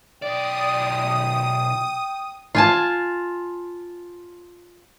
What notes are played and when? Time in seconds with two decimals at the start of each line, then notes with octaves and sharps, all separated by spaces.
0.22 B1 D5 G5 D#6
2.55 F4 G#5 A5